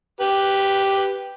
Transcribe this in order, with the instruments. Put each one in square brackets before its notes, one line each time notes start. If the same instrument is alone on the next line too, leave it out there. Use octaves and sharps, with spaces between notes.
[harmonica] G4 B4